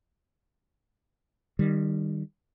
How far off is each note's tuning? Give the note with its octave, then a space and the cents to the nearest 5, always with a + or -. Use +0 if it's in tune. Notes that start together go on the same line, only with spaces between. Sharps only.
D#3 -25 G3 +0